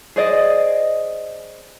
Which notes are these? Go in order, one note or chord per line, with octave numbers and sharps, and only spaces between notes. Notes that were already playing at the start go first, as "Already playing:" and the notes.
G#4 C5 D5 D#5